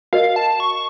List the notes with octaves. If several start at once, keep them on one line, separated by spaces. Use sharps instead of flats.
F#4 A#4 D#5 F5
A5
C#6